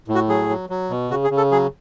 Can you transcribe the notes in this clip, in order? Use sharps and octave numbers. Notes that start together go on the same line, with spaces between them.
A2
F#4
F#3 G#4
F#3
F#3
B2
C#3 F#4
G#4
C#3
A4
F#3 G#4